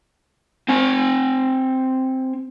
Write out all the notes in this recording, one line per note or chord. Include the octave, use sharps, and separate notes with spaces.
C4 G#5